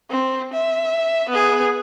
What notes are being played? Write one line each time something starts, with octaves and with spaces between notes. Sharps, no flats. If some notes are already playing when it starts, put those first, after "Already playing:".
C4
E5
B3 G#4